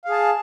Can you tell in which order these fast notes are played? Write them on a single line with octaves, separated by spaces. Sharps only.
F5 G#4 A5